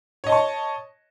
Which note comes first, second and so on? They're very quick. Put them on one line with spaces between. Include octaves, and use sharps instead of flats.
C#5 D#5 A5 C#6